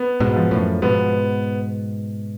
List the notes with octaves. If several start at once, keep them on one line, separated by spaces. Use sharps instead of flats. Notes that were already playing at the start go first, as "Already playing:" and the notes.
Already playing: B3
G#2 B2
F3
F#2 A2
G#2 B2 B3